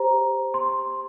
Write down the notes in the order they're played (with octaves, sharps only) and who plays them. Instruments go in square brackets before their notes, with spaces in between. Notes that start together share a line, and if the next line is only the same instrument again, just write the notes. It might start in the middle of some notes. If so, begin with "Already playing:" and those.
Already playing: [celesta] G4 C5 A#5
C6